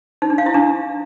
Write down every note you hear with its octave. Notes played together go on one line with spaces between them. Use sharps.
D#4
D4
F5
E4
D4